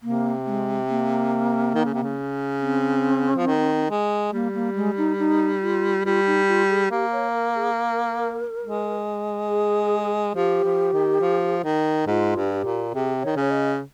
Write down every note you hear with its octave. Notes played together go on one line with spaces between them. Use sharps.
C3 A#3
A#3
G#3
A#3
D#3
C#3
C3
C#3
C4
F3
D#3
G#3
G3 A#3
A#3
G#3
D#4
D#4
F4
G3 F4
D#4
F4
G#4
A#3 G4
C#5
A#4
G#4
A#4
G#3
G#4
F3 G4
F3
D#3
F3
D#3
G#2 F4
G2
G4
A#2
C3 G#4
D#3 C#5
C#3 C#5
D#5